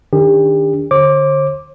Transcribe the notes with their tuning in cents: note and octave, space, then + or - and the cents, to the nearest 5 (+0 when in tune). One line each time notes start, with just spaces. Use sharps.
D#3 -20 D4 -20 G4 +35
D3 +0 C5 +45 D6 +0